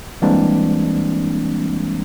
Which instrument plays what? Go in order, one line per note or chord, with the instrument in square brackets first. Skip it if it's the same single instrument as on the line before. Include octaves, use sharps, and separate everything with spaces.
[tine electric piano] E3 G3 G#3 A#3 C4 D4